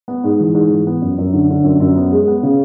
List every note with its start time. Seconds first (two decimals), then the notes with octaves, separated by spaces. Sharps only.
0.08 B3
0.24 G#2
0.40 E3
0.55 G#2
0.71 E3
0.87 B3
1.02 F#2
1.18 F#2
1.33 D3
1.50 D3
1.64 F#2
1.80 F#2
1.96 B3
2.12 G#3
2.28 B3
2.43 C#3